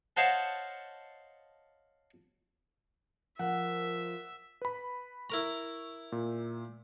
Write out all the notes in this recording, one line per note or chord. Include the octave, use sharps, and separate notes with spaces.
C5 C#5 D#5 F5 F#5 A5
F3 A#4 E5 F#5
B4 B5
E4 A#4 A#5 C#6
A#2